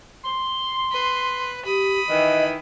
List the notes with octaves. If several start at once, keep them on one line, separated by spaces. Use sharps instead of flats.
C6
B4
G4 B5 D#6
D#3 E3 D#5